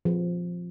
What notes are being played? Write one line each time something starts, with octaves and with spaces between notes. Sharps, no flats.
F3